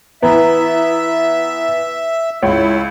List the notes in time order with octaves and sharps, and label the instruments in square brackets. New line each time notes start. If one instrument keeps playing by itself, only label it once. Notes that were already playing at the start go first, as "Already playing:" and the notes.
[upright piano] E3 B3 [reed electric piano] E4 B4 A#5 [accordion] E5
[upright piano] C#2 [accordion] E4 [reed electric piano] C#5